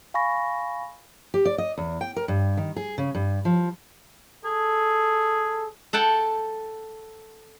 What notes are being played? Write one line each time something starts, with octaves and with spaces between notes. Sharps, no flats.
F5 G#5 B5 C#6 A#6
G4
D5
D#5
E2
G5
A#4
G2
D#3
G#4
C#3
G2
F3
G#4 A4
A4 F#5 G5 A5